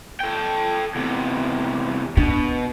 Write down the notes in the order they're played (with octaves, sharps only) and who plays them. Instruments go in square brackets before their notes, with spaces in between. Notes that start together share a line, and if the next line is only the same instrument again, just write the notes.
[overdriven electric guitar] A4 G5
E2 C3
[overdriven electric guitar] B2 [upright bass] D4